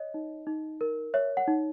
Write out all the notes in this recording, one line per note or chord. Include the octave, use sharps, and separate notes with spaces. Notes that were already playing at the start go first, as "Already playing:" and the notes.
Already playing: C#5 D#5
D#4
D#4
A#4
C#5 E5
F#5
D#4